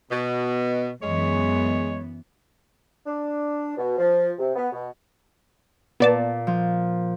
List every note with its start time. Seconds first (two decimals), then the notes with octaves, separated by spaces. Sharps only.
0.11 B2
1.02 F#2 E3 G#3 B3 C#5
3.06 D4
3.77 B2
3.98 F3
4.39 C3
4.55 B3
4.71 B2
6.00 A#2 B3 D5 A5
6.47 F3